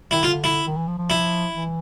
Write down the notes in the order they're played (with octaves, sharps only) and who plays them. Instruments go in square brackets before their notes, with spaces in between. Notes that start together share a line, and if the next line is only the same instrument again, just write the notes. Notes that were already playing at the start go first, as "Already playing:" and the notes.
[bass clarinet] D#3 [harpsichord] E4
[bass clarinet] D3 [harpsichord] F4
[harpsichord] E4
[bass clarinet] D#3
E3
F3
F3
[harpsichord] E4
[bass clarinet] E3